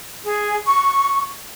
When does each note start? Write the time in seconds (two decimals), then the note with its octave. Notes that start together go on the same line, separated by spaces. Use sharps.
0.24 G#4
0.65 C#6